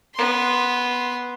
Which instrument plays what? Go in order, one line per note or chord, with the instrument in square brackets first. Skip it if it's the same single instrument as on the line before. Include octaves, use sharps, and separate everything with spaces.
[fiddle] B3 C6